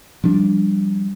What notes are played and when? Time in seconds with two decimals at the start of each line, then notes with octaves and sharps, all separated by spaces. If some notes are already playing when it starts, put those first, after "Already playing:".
0.24 F3 G3 D4